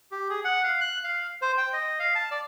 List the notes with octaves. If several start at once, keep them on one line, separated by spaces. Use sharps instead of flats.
G4
G#4
F#5
F5
F#6
F5
C5
G5
D#5
F5
A5
D5